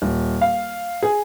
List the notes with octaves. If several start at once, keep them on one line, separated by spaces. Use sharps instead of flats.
D#1
F5
G#4